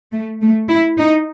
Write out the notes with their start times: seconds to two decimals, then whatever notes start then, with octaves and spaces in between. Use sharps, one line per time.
0.13 A3
0.41 A3
0.69 E4
0.98 D#4